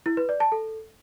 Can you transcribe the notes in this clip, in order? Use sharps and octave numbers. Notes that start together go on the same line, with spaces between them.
E4
B4
D5
A5
A4